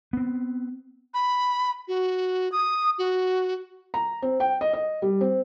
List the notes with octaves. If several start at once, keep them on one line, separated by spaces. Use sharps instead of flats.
B3 C4
B5
F#4
D#6
F#4
A#5
C4
G5
D#5
D#5
G3
C4